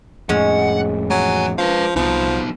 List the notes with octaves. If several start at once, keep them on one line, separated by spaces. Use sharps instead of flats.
F2 A2 G#3 C#4 F#5
E3 F#3 G#5
F3 B4 F5
C2 F3 B3 D#4